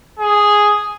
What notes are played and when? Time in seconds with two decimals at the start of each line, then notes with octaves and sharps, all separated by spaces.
0.19 G#4